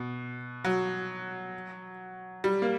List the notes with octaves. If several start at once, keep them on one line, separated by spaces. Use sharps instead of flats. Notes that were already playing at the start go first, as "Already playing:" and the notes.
Already playing: B2
F#3
G3
A#3